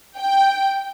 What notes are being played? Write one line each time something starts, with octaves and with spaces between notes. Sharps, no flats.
G5